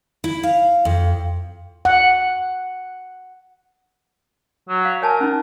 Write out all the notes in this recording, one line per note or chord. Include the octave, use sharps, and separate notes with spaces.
E4
F5
F2
F#5
F#3
F5
A#4 C#5 G#5 A5
C#4 D#4